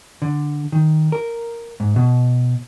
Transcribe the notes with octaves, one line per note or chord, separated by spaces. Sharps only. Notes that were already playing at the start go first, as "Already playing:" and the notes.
D3
D#3
A#4
G#2
B2